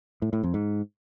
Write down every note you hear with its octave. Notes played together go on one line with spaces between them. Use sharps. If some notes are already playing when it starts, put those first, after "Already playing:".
A2
A2
F2
G#2